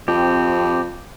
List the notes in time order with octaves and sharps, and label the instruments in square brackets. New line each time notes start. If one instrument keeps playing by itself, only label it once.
[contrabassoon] F2 [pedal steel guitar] C4 G4